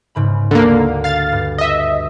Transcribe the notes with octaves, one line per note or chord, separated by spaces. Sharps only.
G#2 C#3 B5
D2 D3 A#3
F5 A6
G2
D#5 E5